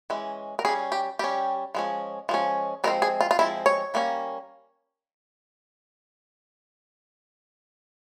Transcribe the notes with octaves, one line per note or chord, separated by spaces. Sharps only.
E3 G#3 C#4
A#4
G3 C#4 G#4
G4
G3 C#4 G4
F3 G#3 C#4
F3 G#3 C#4
F3 G#3 C4 A#4
G#4
F4
F4
F3 G#3 C4 E4
C#5
G3 A#3 C#4